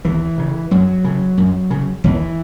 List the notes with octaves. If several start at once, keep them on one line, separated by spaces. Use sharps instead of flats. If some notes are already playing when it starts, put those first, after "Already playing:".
D#2 E3
C#3
F#2 F#3
C#3
F#2
C#3
D#2 E3